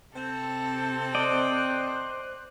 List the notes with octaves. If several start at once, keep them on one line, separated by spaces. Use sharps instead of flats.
C3 C4 A4
C5 D5 D#5 G5 F#6